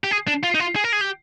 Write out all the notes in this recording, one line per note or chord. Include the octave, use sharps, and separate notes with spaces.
G4
G#4
D4
F4
D#4
F4
G#4
A#4
G#4
G4